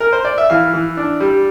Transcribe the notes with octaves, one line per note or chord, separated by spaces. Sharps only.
A#4
C5
D5
E5
E3 F5
E3
D4
G3